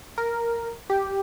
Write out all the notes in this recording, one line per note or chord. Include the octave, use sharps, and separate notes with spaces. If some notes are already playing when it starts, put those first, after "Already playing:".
A#4
G4